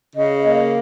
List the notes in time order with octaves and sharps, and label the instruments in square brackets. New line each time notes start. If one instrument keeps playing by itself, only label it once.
[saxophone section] C#3 [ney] D#5
[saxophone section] A#3